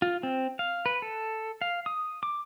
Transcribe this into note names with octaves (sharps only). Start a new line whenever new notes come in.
F4
C4
F5
B4
A4
F5
D#6
D6